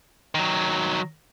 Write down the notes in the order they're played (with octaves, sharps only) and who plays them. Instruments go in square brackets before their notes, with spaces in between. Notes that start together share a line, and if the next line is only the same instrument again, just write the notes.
[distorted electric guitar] D#3 F#3